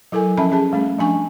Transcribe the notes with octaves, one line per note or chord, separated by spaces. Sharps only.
F#3 E4 A4 A#4 G#5
F3 C#4 E5 A5 B5
C#4 G#4 A5
G3 A3 C#4
F3 D4 G#5 C#6